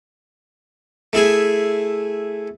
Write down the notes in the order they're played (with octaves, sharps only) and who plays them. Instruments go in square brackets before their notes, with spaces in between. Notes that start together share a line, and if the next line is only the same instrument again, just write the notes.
[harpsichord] A3 E4 G#4